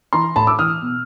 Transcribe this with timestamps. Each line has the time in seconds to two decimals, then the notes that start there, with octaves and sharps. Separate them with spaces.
0.13 E3 A#5 C6
0.36 A2 A5 B5
0.47 D6 E6
0.59 E3 D#6 F6
0.82 B2